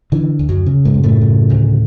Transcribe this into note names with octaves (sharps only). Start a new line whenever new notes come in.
D3 E3
D2
F#2 F#3
C#3
G#2 G#3
F#2
A2 A3
C#3
D2